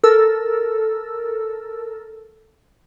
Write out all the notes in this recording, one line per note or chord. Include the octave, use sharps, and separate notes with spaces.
A4 A#4 E6